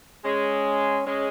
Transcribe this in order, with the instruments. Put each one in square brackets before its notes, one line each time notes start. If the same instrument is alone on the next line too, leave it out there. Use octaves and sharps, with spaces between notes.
[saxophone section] G#3 [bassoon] C#4
[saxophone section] G#3 [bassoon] C#4